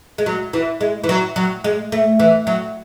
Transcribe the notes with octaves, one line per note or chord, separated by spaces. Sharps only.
G#3
F#3
E3
G#3
E3
F#3
F#3
G#3
A3
E3
F#3